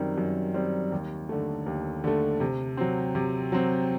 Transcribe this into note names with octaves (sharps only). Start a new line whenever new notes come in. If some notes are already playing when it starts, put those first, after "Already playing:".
Already playing: F#2 D#3 G3 C4
F#2
D#3 G3 C4
D#2
D3 A3
D#2
D3 A3
C3
F#3 C4
C3
F#3 C4